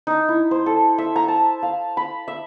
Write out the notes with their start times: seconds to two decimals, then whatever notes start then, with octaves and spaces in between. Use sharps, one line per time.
0.07 D#4
0.29 E4
0.51 C5
0.66 A4
0.98 E5
1.16 A#5
1.28 A5
1.63 F5
1.97 B5
2.28 E5